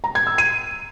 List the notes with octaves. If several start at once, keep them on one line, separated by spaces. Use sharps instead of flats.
A#5
G#6
E6
D#7